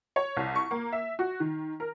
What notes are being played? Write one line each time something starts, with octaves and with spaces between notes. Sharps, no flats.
C#5
C2
C#6
A#3
E5
F#4
D#3
A#4